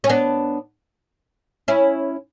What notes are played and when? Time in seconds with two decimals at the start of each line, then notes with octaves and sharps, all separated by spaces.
0.04 C#4
0.09 B3 D4
1.68 C#4 E4